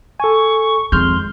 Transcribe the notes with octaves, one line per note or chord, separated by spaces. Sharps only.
A4 G#5 C#6
F2 D#3 G#3 C6 F6 G6